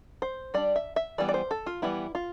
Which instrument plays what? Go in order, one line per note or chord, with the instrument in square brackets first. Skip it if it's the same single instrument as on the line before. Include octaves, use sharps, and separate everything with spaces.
[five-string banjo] C5
G3 D4 D5
E5
E5
E3 G3 B3 D5
D5
C5
A4
F4
E3 G3 B3 E4
F4